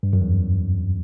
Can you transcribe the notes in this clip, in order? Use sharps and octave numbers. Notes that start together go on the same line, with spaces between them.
G2
F#2
E2